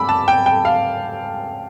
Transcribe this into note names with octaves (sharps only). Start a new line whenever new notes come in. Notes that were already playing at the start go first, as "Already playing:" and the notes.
Already playing: B5 D6 E6
A5
G5
G5
F5